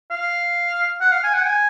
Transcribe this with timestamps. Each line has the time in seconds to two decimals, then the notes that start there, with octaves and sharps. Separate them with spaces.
0.11 F5
1.01 F#5
1.12 F5
1.24 G#5
1.34 F#5
1.45 G#5